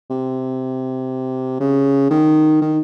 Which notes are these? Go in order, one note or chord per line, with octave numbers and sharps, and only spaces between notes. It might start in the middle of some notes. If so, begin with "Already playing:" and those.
C3
C#3
D#3
D#3